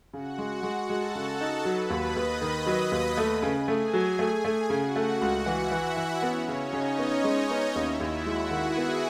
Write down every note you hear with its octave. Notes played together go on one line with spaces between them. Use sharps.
C#3 F#4 F#5
G#3
G#3
G#3 A4 A5
C#3
D#4
F#3 B4 B5
D#2
D#5 D#6
D#2
D#3
F#3
D#2
A3
C#3
G#4 G#5
A3
F#3
A3
A3
C#3 F#4 F#5
A3
C#2
E3 E4 E5
E3
E3
B3 C#4 C#5
C#3
D#4 D#5
C#3
B3 C#4 C#5
G#3
D#4 D#5
B3
D#2 E4 E5
D#2
F#4 F#5
G#3
D#3 G#4 G#5
B3